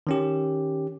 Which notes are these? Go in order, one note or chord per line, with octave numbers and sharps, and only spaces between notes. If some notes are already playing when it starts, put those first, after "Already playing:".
D#3 C#4 G4